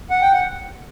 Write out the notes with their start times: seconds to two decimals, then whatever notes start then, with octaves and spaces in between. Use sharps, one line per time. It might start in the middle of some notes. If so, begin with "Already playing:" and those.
0.10 F#5
0.21 G5
0.33 F#5